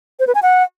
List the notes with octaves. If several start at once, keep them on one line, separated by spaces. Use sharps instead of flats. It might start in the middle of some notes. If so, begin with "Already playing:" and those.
C5
B4
G#5
F#5